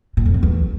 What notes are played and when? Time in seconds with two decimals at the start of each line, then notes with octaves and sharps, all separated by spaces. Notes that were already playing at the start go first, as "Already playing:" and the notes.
0.17 A#2
0.26 F2
0.34 A2
0.43 E2